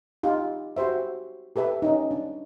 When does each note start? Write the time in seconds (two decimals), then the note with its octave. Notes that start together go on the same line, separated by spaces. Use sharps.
0.23 D#4 F4 G4
0.77 F#4 G4 C5 E5
1.56 G4 A4 B4 E5
1.82 C#4 D#4
2.11 D4